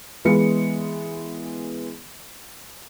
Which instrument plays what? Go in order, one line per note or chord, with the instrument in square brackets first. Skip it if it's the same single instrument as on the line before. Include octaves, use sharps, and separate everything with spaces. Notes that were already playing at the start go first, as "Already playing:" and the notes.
[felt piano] E3 G#3 B3 C#7